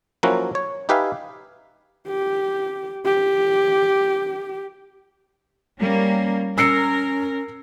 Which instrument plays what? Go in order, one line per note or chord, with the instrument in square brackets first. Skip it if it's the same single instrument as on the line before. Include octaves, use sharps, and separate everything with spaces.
[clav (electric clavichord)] F3 F#3 A#3 C#4 E4 F#4
C#5
D#4 G4 B4 E5 F5 G#5
[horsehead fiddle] G4
G4
[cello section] G3 A#3 C#4
[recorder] C#4 [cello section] A#4 [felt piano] E6 C7 C#7